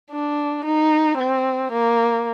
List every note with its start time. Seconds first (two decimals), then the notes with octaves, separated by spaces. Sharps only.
0.12 D4
0.65 D#4
1.18 C4
1.72 A#3